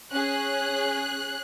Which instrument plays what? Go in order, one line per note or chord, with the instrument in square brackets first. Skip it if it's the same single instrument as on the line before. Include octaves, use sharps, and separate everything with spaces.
[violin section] C#4 G#4 F#6